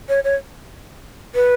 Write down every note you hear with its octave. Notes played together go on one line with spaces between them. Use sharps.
C#5
C#5
B4